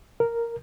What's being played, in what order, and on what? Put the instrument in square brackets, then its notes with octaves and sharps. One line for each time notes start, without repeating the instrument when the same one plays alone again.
[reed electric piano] A#4